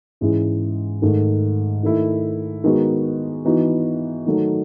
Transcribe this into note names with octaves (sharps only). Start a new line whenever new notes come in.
G#2 E3 G#3 C#4 E4
G#2 D#3 A3
D#3 A3 E4
D#3 G#3 B3 D#4 F#4
E3 B3 D#4 F#4
D#3 F#3 A3 D#4